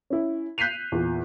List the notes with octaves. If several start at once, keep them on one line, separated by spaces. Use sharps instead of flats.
C#4 E4
F#6 G6 B6 C7 D#7 F7
E2 A#2